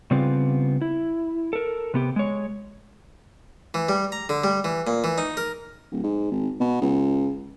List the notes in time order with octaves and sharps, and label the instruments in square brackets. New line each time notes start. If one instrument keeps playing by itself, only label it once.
[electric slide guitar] C#3 G3 B3 C4 F4
E4
A4 A#4
C3 B3 G4
G#3 C#5
[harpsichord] E3
G3
A#5
D3
G3
E3
A#2
E3
D#4
A#4
[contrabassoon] D1
G#2
G#1
B2
C#2